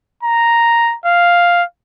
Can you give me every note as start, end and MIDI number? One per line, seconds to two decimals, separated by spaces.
0.23 0.95 82
1.06 1.63 77